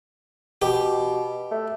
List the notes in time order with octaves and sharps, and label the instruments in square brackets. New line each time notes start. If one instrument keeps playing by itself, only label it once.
[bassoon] B2 [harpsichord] G4
[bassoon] A3